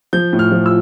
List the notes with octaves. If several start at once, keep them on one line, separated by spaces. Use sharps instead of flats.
F3 G6
A2
F6
F3
E6